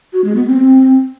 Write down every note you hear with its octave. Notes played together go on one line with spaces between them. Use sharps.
F#4
G#3
B3
C4